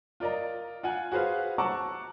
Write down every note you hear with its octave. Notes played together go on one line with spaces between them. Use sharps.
F4 A#4 D5 D#5 A#5
F4 F#5 G#5
F#4 G#4 B4 C5 F5
F#5 A5 A#5 C#6 D6 E6